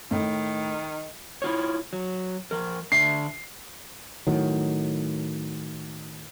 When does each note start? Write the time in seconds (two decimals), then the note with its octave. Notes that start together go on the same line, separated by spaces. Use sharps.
0.11 A2 D#3
1.42 E4 F4 C#5
1.93 F#3
2.51 F3 A#4
2.92 D3 D4 E5 C7
4.27 A2 D#3 F#3